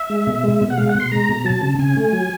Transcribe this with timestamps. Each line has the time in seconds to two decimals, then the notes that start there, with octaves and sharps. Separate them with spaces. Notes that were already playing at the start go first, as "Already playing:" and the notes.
Already playing: E5
0.10 G#3
0.27 B2
0.44 G#3
0.61 B2
0.70 F#5
0.77 G#3 F5
0.89 F#5
0.94 B2
1.00 C6
1.11 G#3 A#5
1.29 B2
1.45 F#3 A5
1.63 C#3
1.79 C#3 G#5
1.96 A3
2.13 F#3